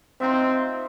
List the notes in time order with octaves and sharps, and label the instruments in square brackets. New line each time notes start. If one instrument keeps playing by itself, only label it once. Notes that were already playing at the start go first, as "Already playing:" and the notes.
[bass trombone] C4 [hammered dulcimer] D#4 F4 E5